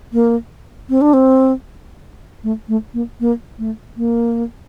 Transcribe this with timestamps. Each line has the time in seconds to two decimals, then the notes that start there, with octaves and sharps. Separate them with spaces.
0.13 A#3
0.89 C4
1.01 D4
1.13 C4
2.44 A3
2.68 A3
2.94 A#3
3.20 A#3
3.59 A3
3.97 A#3